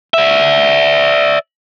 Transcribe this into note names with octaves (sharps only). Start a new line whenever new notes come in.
D5 E5